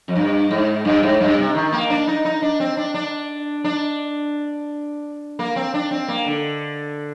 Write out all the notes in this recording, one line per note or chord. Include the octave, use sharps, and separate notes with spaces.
F2
G2
G#2
G2
G#2
G2
C3
D#3
A#3
D4
D#4
D#4
D4
C4
D4
D4
D4
A#3
C4
D4
C4
A#3
D3